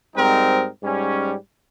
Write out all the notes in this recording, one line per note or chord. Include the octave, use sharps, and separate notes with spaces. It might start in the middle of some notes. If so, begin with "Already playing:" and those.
G#2 G3 C4 D#4 A#4
G#2 G3 C#4